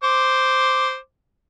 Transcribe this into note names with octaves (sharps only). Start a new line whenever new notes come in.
C5 D6